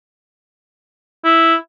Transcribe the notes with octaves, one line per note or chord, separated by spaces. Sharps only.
E4